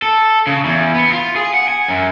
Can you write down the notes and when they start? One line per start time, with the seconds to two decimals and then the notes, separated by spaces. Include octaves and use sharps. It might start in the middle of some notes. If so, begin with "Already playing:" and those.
0.02 A4
0.47 C#3
0.65 E2
0.95 B3
1.12 F4
1.36 G#4
1.54 F#5
1.68 G#5
1.88 F#2